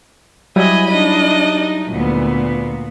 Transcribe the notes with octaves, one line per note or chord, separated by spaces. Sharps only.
F#3 G3 E4 D#5 G#5 B5
D4 D#4 D#5
D2 A#2 B3